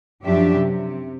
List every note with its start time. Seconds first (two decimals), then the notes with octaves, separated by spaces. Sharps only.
0.23 F#2 F3 D4 G4 E5
0.55 C3